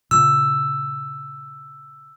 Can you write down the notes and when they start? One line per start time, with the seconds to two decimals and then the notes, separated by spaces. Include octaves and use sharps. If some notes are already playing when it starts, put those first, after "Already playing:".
0.11 A#2 C#3 E6